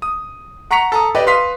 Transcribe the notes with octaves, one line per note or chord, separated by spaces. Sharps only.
D#6
F#5 A#5 C#6 B6 C#7 F7
A4 A#5 D#6
G4 B4 D5 D#5
B4 F5 C6 D#6 B6